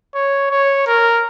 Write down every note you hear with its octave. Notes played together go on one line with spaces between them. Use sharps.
C#5
C#5
A#4